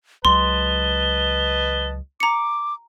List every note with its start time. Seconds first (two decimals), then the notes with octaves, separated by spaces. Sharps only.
0.25 C#2 F#3 B4 D#5 A5 C6 G7
2.20 A#5 D6 C#7